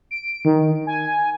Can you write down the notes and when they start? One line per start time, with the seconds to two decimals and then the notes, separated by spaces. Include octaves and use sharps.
0.11 D7
0.45 D#3
0.87 G#5